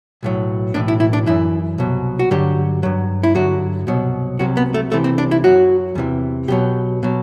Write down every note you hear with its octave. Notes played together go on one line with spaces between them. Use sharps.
B1 A2 F#3
B1 A2 E3 D4
E4
E4
D4
F#2 E3 E4
C2 B2 F#3
F#4
G2 D3 F#3 G4
G2 F#3
E4
G2 D3 F#3 F#4
C2 B2 F#3
C2 C3 F#3 F#4
B3
A3
C2 C3 E3 A3
C4
D4
E4
F#2 F#3 F#4
E2 C3 E3
B1 B2 F#3 G4
B2 F#3